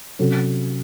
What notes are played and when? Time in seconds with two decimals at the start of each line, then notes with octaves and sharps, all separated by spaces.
0.19 C3 F#3 C#4 F#4 A4